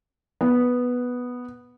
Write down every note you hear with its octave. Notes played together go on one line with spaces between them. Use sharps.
B3